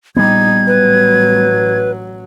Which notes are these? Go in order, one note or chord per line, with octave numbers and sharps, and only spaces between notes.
A#1 G3 B3 D#4 G#6
A1 F#3 B4